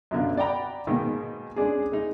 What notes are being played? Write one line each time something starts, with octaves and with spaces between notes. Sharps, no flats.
F#2 B2 D3 F4
D5 F#5 G5 A#5 B5
G#2 B2 D#3 A#3
G#3 C#4 D4 G#4
G#3 D#4